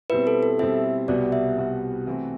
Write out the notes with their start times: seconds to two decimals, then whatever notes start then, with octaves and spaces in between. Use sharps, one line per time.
0.10 B2 G3 C4 E4 B4
0.27 A4
0.43 A4
0.59 B2 G3 C4 E4 E5
1.08 C2 B2 G3 B3 F#4 D5
1.32 E5
1.57 C2 B2 G3 B3 F#4
2.06 C3 E3 A3 C4 F#4